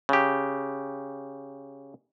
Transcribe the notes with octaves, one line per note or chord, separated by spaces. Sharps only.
C#3 G4